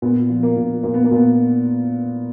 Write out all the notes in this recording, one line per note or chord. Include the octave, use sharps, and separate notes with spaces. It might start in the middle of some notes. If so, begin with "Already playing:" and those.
A#2 B3
F3
A#3
A#2
A#2 A#3
B3
A#3
A#2 B3